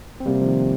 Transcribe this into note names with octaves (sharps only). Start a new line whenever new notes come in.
C4
C3 G3 A#3
F3
D#3